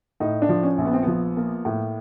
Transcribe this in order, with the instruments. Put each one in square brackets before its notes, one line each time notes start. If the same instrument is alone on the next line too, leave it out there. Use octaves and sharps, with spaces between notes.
[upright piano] A2 D#4
D4
F3
C#4
A#1
B3
C4
F3 B3
A#3
A2